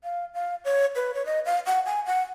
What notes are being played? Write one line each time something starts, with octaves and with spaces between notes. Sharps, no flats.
F5
F5
C#5
B4
C#5
D#5
F5
F#5
G#5
F#5